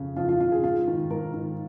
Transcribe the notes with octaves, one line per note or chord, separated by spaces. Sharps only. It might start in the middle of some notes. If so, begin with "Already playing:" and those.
Already playing: F2 C#3
F2 F4
F4
C#3 F4
G#4
G#2 F4
D#3
G#2 A#4
D#3